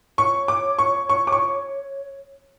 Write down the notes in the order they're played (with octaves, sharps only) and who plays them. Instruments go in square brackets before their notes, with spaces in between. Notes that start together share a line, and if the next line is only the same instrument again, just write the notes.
[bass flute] C#5 [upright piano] C#6
[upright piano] D6
C#6
C#6
D6
C#6